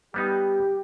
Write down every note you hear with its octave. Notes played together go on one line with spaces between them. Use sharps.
G3 B3 D#4 G4